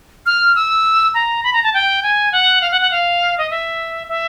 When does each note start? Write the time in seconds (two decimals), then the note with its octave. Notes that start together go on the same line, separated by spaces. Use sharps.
0.26 F6
0.55 E6
1.14 A#5
1.44 B5
1.53 A#5
1.63 A5
1.74 G5
2.03 G#5
2.32 F#5
2.61 F5
2.71 F#5
2.81 F#5
2.91 F5
3.38 D#5
3.50 E5
4.09 E5